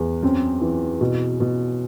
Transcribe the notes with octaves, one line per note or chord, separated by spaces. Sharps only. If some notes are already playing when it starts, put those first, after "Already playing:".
Already playing: E2
F#2 C4
E3
B2
B2